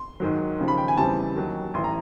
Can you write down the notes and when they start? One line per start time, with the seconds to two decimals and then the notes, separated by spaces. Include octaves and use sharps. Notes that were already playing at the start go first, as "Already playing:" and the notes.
Already playing: C6
0.20 G#2 D#3 F#3
0.59 D#2 C#3 F3
0.68 B5
0.77 G5
0.88 G#5
0.97 E2 C#3 E3 G3 C4 A5
1.36 D#2 D#3 F#3
1.74 A1 E3 C6
1.84 A#5